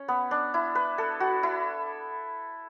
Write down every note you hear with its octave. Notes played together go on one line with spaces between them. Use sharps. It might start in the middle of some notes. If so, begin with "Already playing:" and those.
Already playing: C#4 C#5
B3
D4
E4
B4
A4
F#4
E4